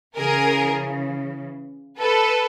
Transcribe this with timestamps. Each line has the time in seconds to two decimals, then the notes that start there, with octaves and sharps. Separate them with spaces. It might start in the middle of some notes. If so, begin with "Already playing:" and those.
0.16 C#3 E3 G#4 A#4
1.99 A4 B4